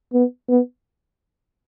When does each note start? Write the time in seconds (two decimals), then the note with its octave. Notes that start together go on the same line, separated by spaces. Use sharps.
0.13 B3
0.49 B3